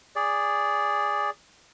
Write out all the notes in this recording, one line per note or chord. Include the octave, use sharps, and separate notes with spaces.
G#4 D5